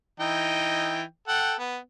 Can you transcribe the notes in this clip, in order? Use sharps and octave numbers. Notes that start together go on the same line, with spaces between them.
E3 D#4 G5
A4 F#5 G5
B3